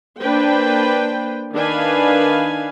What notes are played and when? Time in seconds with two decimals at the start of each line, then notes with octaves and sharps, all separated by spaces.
0.21 A#3 D4 B4 C5 G5
1.55 D#3 D4 B4 F5 G#5